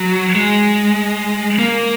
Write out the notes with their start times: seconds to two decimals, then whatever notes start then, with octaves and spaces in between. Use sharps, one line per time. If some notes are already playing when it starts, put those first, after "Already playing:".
Already playing: F#3
0.35 G#3
1.59 A#3